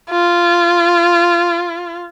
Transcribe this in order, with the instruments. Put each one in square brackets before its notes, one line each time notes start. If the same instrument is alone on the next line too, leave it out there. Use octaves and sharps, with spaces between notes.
[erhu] F4